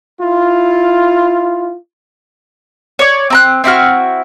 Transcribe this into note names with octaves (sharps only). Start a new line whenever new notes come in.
E4 F4
C#5 D5
C4 A#5 F#6
C4 E4 F#4 F6